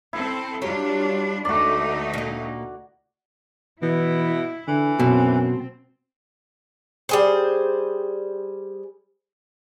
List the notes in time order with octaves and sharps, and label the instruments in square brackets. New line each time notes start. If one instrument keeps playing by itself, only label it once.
[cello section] C4 A4 [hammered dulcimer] E4
[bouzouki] F#3 G4 C#5 [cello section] G3 D4 F4
[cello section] D2 A3 D#4 [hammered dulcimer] F#4 D5 [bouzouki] A#4
[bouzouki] A#2 A#3
[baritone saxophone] B2 [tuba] E3 [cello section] E4
[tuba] D3 [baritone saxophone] E3
[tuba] F#2 [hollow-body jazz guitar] B2 [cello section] C4
[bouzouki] G3 G#4 C5